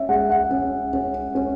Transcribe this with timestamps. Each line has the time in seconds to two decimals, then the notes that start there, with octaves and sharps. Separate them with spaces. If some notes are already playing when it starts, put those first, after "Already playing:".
Already playing: C#4 E5
0.09 G#3 F#5
0.30 F#5
0.51 C#4
0.93 C#4
1.35 C#4